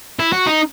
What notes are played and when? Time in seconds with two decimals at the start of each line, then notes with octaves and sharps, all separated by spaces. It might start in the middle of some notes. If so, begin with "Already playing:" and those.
0.20 E4
0.33 F#4
0.46 D#4